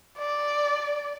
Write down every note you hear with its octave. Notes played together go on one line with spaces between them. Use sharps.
D5